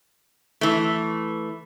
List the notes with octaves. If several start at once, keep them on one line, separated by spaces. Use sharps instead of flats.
E3 A3